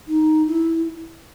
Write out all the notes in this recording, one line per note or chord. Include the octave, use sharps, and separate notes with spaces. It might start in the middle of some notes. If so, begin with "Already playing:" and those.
D#4
E4